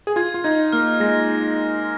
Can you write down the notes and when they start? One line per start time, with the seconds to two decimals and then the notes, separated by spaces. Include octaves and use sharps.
0.07 G#4
0.16 F4 G#6
0.34 F4
0.44 D#4 G#6
0.72 A#3 F6
1.00 G#3 A#6